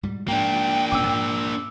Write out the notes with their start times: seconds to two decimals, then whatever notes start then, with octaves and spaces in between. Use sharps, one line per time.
0.03 G#2 B2 G3
0.28 G#2 A#3 D4 G5
0.92 E1 A#2 C#4 D6 E6
1.07 G#2